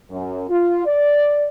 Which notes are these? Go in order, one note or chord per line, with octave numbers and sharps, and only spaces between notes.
F#2
F4
D5